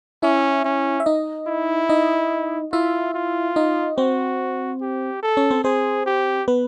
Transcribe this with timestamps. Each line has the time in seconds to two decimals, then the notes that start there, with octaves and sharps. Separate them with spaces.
0.23 C#4 E4 E5
0.65 C#4
1.00 E5
1.06 D#4 D#5
1.48 E4
1.89 D#4 D#5
2.73 E4 F4 E5
3.14 F4
3.56 D#4 D#5
3.97 C4 F#4 C5
4.81 G4
5.23 A4
5.37 C#4 C#5
5.51 C4 C5
5.64 C4 G#4 C5
6.06 G4
6.48 B3 B4